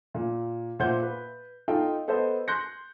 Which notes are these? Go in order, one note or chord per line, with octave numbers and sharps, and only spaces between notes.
A#2
A#2 C5 E5 F#5 G6
B4
D#4 F4 A4 D#5 F5 G5
B3 A4 C5 D#5
C6 F#6 G6 A#6 C#7